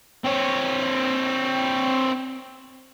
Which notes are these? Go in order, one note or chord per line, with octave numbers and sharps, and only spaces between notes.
C4 C#5